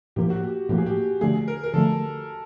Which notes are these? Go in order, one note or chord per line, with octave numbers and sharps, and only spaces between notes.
A2 F3 A#3 G4
F#4
G4
A2 F3 A#3 G4
G#4
G4
D3 F3 A3 G#4
A#4
A#4
D3 F3 A3 A4